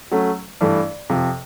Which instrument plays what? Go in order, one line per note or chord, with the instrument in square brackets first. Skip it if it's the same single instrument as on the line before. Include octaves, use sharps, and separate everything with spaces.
[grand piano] F#3 A3 C#4
G2 E3 A3
F2 C3 F3